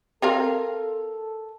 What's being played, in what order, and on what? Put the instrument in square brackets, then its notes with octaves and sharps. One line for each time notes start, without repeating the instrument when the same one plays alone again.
[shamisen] C4 A#4 F5 [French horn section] A4